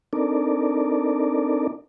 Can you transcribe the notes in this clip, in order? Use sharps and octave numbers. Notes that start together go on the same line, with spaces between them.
C4 D4 D#4 A4 A#4 D5